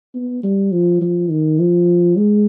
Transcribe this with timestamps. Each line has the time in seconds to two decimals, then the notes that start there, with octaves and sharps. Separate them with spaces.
0.15 B3
0.43 G3
0.72 F3
1.01 F3
1.30 D#3
1.60 F3
2.17 G#3